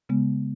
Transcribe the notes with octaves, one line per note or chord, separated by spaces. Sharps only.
C#3 G#3 B3